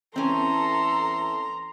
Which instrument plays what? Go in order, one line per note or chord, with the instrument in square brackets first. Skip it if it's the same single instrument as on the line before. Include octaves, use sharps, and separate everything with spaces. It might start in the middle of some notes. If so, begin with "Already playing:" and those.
[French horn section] E3 A4 [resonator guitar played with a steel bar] C4 C#4 [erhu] A#5 [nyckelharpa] C6